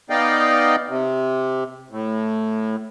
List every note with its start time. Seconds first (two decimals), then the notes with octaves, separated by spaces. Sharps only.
0.10 B3 D#4 D5 D#5 F5 G5
0.89 C3
1.90 A2